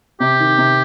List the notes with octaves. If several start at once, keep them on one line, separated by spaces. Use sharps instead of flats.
C3 G4
D#3
C3